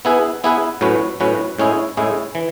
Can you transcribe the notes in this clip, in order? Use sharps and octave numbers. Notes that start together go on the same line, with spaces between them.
B3 E4 G#4 B4
B3 E4 G#4 B4
A2 F#3 C#4 F#4 B4
A2 F#3 C#4 F#4 B4
A2 G#3 C#4 E4 G#4
A2 G#3 C#4 E4 G#4
E3